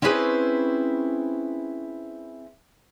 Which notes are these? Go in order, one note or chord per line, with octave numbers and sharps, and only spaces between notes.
C4 C#4 E4 G#4 B4 C5